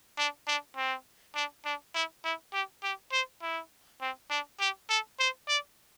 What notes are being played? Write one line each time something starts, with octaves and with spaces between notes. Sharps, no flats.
D4
D4
C4
D4
D4
E4
E4
G4
G4
C5
E4
C4
D4
G4
A4
C5
D5